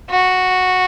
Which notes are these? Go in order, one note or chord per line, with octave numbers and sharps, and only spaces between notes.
F#4